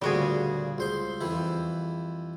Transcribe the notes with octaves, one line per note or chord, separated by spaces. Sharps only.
D2 A#2 C#3 G3 F#4 G#4
C#2 C5 C6
F2 E3 E4